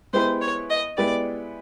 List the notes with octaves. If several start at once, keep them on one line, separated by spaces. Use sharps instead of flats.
G#3 B3 E4 G4 B4 C5
C#5
D#5
G#3 B3 E4 G4 B4 D5